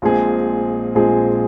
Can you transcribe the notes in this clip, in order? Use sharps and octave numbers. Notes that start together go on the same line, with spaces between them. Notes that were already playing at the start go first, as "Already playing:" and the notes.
A#1 A#2 G#3 C4 G#4
A#1 A#2 G#3 C4 G#4